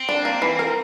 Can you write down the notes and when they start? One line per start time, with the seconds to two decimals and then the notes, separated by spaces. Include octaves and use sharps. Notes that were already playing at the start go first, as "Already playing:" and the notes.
Already playing: C4
0.09 D4
0.25 A#3
0.42 E3
0.59 A#4